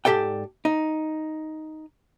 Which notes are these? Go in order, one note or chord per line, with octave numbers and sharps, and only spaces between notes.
G#2 G4 A4 D5 G5
D#4